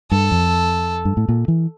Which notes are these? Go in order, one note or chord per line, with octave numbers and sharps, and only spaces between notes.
G2 A4
F2
G2
A2
A#2
E3